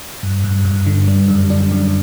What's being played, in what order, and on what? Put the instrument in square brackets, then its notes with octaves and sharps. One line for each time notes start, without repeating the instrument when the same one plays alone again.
[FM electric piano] G2
G2
G2
D3
G3
F#2
D4
F#2